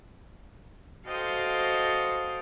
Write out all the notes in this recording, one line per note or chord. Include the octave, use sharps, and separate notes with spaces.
F#4 A4 C5 D#5 F5 G5